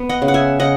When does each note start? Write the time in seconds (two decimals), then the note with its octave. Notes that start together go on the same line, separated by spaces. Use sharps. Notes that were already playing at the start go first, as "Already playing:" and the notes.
Already playing: B3
0.09 D#5 F#5
0.22 C#3
0.28 F#5
0.34 E5 G#5
0.60 C#3 D#5 F#5